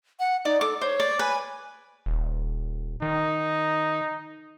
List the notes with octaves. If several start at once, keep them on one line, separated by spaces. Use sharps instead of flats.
F#5
D#4 D5
A4 D6
C5 C#5
D5
B4 G#5
D#1
D#3 D#4